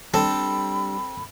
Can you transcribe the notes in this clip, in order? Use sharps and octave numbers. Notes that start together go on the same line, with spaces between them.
G3 C4 D4 A4 B5